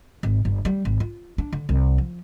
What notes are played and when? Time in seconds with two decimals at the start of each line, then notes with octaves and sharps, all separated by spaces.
0.23 G#1
0.45 G1
0.65 G3
0.85 G#1
1.00 F4
1.38 D4
1.53 D3
1.69 C2
1.98 F3